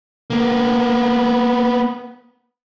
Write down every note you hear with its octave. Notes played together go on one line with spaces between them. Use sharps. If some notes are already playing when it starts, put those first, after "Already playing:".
A#3 B3